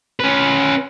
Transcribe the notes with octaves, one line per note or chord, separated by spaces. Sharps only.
C#4 B4